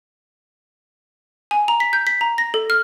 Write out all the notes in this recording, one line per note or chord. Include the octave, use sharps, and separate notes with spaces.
G#5
A#5
B6
G6
B6
A#5
A#6
A4
F6